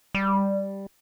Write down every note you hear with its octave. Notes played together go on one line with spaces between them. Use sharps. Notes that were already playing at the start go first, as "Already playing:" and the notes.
G3